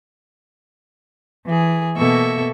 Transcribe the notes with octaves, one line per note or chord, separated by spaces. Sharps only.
E3 G#4
B2 A#3 A4 E5 C#6